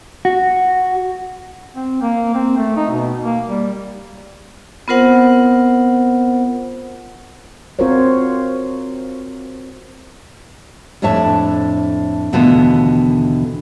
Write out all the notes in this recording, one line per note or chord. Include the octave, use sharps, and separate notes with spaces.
F#4
C4
A#3
C4
A3
D#4
B2
A#3
G3
B3 C4 F4 A#4 C5 F#5
C4 F4 F#4 A#4 C5 C#5
F2 A2 D4 C#5 E5 A5
D#2 B2 D3 E3 A3 F4